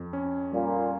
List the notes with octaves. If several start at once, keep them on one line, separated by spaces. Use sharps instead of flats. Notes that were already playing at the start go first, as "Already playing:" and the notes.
Already playing: F2
C#4
A#2 G3